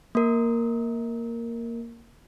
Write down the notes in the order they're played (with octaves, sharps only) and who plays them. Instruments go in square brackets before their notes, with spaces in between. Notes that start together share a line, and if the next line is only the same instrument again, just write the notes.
[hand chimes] A#3 A#4